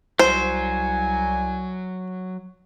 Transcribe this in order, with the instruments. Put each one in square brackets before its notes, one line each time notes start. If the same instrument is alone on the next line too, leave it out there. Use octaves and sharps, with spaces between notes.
[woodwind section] C2 G#5 [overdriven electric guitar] F#3 [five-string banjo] C5